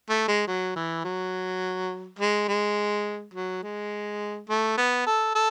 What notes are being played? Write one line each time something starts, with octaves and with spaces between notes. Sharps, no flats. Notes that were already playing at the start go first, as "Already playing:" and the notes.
A3
G#3
F#3
E3
F#3
G#3
G#3
F#3
G#3
A3
B3
A4
A4